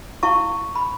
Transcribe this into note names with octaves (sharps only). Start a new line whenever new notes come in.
E4 F5 A5 C#6
B5